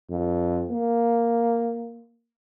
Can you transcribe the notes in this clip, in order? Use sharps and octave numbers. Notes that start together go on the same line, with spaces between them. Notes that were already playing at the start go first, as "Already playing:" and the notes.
F2
A#3